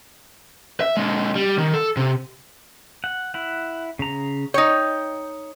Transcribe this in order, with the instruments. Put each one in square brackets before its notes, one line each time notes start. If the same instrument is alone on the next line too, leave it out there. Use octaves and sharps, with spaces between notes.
[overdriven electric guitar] E5
D3 G#3
G3
D#3
A4
C3
[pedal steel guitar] F#5
E4 F#5
C#3 A#5
[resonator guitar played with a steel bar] D#4 C#5 [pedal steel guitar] G5